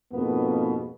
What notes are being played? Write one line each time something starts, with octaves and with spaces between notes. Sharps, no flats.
F2 G#2 B2 A#3 B3